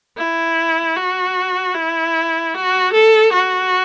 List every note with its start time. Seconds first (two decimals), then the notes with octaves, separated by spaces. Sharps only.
0.17 E4
0.96 F#4
1.75 E4
2.54 F#4
2.93 A4
3.33 F#4